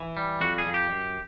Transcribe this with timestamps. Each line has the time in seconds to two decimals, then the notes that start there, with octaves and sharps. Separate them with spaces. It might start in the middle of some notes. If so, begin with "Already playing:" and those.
Already playing: E3
0.17 G3
0.41 F2 F#4
0.58 G#4
0.66 F2
0.74 G4
0.90 F#2